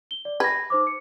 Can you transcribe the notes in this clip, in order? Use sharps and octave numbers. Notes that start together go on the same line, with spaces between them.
G7
D5
B4 G#6 A#6
D#4 C5 D6
C#7